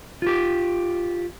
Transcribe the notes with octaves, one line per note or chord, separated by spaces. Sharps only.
F4 G4